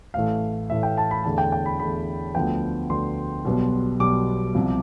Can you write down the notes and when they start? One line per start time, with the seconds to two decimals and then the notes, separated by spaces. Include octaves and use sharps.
0.14 A1 A2 E3 A3 F5
0.70 A1 A2 E3 A3 E5
0.83 G5
0.98 A5
1.11 B5
1.24 E2 D3 A3 A5
1.38 G5
1.52 G5
1.66 B5
1.79 E2 D3 A3 B5
2.34 D2 D3 F3 B3 G5
2.90 D2 D3 F3 B3 C6
3.45 B1 B2 G3 B3
4.00 B1 B2 G3 B3 D6
4.55 C2 C3 F3